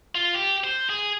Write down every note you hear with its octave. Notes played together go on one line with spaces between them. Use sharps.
F4
G4
C5
G#4